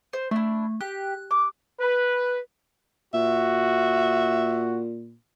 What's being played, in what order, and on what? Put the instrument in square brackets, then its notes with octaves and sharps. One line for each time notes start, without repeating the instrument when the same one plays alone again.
[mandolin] C5
[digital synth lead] A3 [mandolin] D4 E4
[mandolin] G4 [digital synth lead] F#6
[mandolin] D6
[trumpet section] B4
[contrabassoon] A#2 [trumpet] F#4 [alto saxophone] E5